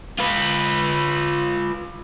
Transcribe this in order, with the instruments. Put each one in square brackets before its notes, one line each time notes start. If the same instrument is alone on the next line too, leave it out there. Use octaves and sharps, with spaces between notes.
[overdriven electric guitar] F4 B4